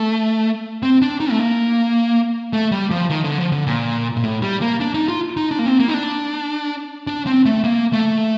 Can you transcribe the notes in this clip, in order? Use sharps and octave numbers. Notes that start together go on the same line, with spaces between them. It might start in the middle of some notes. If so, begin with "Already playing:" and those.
Already playing: A3
C4
D4
D#4
A3
A#3
A3
G3
F3
D#3
D3
F3
D3
A#2
A#2
A2
G3
A#3
D4
D#4
F4
D#4
D4
A#3
C4
A#3
D#4
D4
D4
C4
A3
A#3
A3